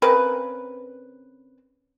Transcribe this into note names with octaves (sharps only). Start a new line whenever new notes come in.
C#3 C4 A#4 B4